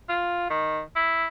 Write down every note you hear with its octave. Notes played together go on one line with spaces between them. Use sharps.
F4
D#3
E4